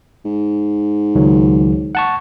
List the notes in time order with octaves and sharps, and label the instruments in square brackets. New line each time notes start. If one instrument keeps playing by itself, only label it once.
[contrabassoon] G#2
[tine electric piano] C#2 D#3 F#3
F#5 A5 C#6